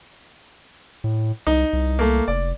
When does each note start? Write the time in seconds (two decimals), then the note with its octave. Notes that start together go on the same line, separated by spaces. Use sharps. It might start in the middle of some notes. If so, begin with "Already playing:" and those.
1.04 A2
1.47 C2 D#4
1.73 C2
1.99 A3 A#3
2.28 F1 D5